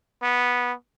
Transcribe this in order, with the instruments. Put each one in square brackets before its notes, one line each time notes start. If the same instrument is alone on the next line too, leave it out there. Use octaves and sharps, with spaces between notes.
[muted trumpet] B3